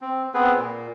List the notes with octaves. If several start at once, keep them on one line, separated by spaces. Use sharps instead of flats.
C4
B3 C4 G#4 B4
A#2